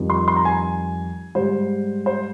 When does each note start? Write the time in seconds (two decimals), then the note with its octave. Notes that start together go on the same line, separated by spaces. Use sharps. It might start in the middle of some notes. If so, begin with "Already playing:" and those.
Already playing: F2 D#3 G3
0.10 C6
0.28 C6
0.36 A#5
0.45 G#5
1.35 G#2 G3 C5
2.06 C5